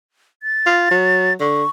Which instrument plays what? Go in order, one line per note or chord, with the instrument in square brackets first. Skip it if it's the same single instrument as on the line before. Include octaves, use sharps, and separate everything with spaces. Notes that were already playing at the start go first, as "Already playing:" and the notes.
[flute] A6
[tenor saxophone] F4
F#3
[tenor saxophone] D3 [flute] C#6